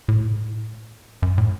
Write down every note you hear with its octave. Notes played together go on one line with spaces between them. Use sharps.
A2
F#2
A2